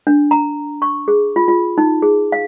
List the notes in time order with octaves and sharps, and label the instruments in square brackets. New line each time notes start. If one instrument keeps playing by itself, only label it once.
[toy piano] D4
A#5
C#6
G#4
F4
F4
D#4
G#4
F5